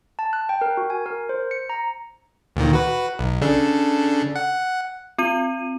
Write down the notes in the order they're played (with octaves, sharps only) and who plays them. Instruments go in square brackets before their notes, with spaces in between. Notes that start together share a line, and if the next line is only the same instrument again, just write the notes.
[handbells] A5
F#6
G5
A#4
F#4
G#5
A#4
C5
C#7
A#5
[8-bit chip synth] D2 A#2 D#3
F#4 B4
B1
C#3 D4 A4
F#5
[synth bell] C4 F4 D#7